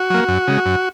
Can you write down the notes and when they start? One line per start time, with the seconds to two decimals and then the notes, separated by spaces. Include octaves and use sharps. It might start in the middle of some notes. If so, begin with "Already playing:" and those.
Already playing: F#4
0.10 F#3 A#3
0.28 F#2
0.47 C#3 G#3
0.66 F#2